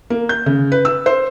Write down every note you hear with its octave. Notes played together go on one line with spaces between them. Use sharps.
A#3
G6
C#3
B4
E6
C5